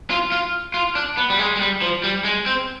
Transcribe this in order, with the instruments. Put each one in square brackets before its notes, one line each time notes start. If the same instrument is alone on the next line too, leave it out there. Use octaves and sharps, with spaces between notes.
[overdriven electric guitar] F4
F4
F4
D4
B3
G3
G#3
G#3
G3
F3
G3
G#3
C4